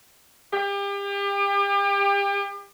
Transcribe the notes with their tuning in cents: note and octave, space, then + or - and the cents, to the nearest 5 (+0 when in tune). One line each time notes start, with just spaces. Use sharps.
G4 +35